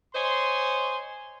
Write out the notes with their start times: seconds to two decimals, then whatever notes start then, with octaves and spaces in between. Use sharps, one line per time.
0.15 C5 C#5 D#5 G#5 C6